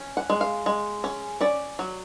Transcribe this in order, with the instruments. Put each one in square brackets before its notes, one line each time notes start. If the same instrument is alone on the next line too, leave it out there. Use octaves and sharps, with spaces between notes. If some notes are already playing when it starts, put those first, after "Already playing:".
Already playing: [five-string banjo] C#4
F#5
G#3
F5
G#3
C#4
C#4 D5
F#3